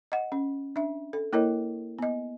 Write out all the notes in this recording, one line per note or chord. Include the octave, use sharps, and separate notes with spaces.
D#5 F#5
C#4
D4 E5
A4
A#3 E4 A#4 C#5 D#5
B3 D#5